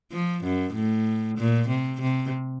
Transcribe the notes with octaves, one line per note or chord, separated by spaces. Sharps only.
F3
F#2
A2
A#2
C3
C3